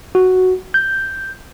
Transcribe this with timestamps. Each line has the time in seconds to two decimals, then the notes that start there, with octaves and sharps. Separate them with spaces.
0.15 F#4
0.74 G6